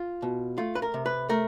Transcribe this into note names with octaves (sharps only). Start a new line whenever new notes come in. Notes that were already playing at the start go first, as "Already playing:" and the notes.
Already playing: F4
B2
A3 F4
B4
A#4
C3
B4
A3 A#4